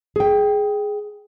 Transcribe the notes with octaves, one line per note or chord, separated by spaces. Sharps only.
G#4 G5